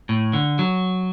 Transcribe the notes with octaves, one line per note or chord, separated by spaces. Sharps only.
A2
D3
F#3